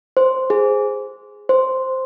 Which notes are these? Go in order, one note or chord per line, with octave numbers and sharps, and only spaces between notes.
C5
G#4
C5